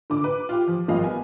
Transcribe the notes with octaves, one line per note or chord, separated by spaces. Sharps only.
D3 D6
B4
F4 G4
F3
G#1 F3 G3 D#5 F5
B3 G#5